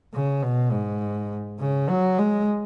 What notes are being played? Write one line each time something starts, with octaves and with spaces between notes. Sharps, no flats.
C#3
B2
G#2
C#3
F#3
G#3